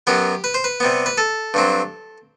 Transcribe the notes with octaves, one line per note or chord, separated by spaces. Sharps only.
F#2 F#3 B3 G4
B4
C5
B4
C3 G3 B3
B4
A4
G2 F#3 C4